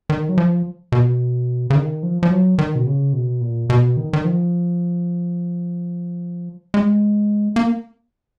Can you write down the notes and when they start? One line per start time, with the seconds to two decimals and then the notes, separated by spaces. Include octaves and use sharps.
0.10 D#3
0.29 F#3
0.38 F3
0.92 B2
1.70 C#3
1.75 D#3
2.03 F3
2.23 F3
2.30 F#3
2.58 D#3
2.75 B2
2.86 C#3
3.13 B2
3.41 A#2
3.70 B2
3.97 D#3
4.13 D#3
4.25 F3
6.74 G#3
7.56 A#3